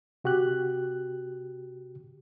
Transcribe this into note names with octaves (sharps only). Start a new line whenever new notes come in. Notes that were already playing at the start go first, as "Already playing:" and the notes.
C3 F#4 G4 F#6